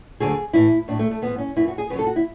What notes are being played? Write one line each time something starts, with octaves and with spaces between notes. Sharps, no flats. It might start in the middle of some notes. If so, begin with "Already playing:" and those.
D2 D3 F#3 G#4
A2 E3 E4
A2 F#3 D4
A3
A3
G#2 E3 B3
C#4
F#2 E3 E4
F#4
G#4
F#2 C#3 F#3 B4
A4
F#4
E4